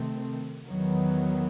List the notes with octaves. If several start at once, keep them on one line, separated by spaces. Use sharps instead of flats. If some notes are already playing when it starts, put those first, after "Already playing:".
Already playing: C3 D#3 A3 C4
E2 D#3 F#3 B3